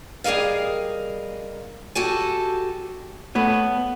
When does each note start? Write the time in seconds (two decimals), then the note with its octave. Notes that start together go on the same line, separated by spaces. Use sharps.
0.24 G3 G#4 A#4 D#5 F5
1.95 F#4 G4 A4 G#5
3.35 A3 B3 C#5